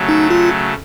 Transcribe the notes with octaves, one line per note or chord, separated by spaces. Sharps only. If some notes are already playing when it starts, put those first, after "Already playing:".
Already playing: C#3 F#3 A3
D#4
F4